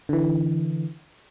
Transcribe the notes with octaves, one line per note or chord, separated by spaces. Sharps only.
D3 E3